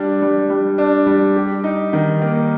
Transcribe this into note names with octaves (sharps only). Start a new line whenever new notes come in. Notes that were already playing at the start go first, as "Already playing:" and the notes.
Already playing: G3 D4
G3
G3
D4
G3
G4
D#4
D#3
A#3